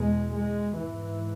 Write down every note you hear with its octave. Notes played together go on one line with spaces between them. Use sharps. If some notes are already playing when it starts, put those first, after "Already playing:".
Already playing: E2 B2 G#3
G#3
G#2 E3